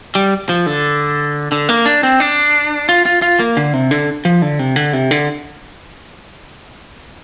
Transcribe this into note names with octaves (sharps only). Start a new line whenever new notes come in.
G3
F3
D3
D3
A#3
D4
C4
D4
F4
F4
F4
A#3
D3
C3
D3
F3
D3
C3
D3
C3
D3